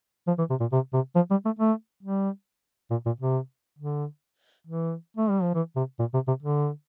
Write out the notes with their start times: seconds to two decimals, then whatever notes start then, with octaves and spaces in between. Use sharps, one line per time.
0.28 F3
0.38 E3
0.50 C3
0.60 A#2
0.72 C3
0.93 C3
1.15 F3
1.31 G3
1.45 A3
1.59 A3
2.03 G3
2.91 A#2
3.06 A#2
3.20 C3
3.79 D3
4.67 E3
5.17 A3
5.30 G3
5.42 F3
5.55 E3
5.76 C3
5.99 A#2
6.14 C3
6.28 C3
6.43 D3